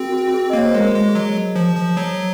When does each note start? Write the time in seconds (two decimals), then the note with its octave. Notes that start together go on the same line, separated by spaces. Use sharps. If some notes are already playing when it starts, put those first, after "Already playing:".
Already playing: C4 F#4 G#4 A#4
0.12 F#4
0.28 F#4
0.34 G#4
0.50 D#5
0.53 A#3 C#5
0.66 C5
0.73 G#3 A#4
0.80 G#4
0.95 G#3
1.08 G#4
1.15 F#3
1.56 F3
1.76 F3
1.97 F#3